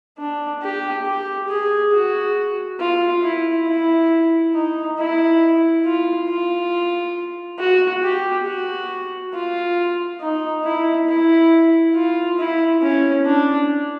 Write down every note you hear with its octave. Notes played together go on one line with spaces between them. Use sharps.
D4
G4
G4
G#4
F#4
F4
E4
E4
D#4
E4
F4
F4
F#4
G4
F#4
F4
D#4
E4
E4
F4
E4
C#4
D4